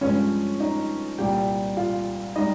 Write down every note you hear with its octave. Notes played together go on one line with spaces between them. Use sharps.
G2 F3 G#3 C#4 C#5
D#4 D#5
C2 A#2 G3 G4 G5
F4 F5
G3 D#4 D#5